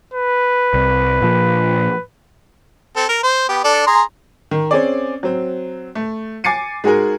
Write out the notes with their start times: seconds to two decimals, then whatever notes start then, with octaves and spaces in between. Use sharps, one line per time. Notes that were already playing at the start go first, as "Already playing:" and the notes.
0.14 B4
0.74 C2
1.22 A#2 F3
2.96 C4 A4
3.09 A#4
3.23 C5
3.49 B3 G4
3.64 D4 A4 D5
3.87 G#4 A#5 C6
4.51 D#3
4.71 C4 C#4 G#4 D5
5.23 F#3 C4
5.95 A3
6.44 G#5 D6 A6 C7 C#7 D#7
6.84 G#3 D#4 F#4 G#4 A#4